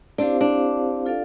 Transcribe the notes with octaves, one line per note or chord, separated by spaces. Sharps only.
C4 D4 E4 G4 C5 F5
D4
F4 A4 D5 F5